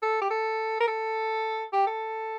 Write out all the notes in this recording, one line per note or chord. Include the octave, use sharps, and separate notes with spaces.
A4
G4
A4
A#4
A4
G4
A4